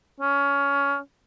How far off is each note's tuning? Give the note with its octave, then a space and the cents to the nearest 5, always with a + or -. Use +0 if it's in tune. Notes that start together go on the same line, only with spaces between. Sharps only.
C#4 +20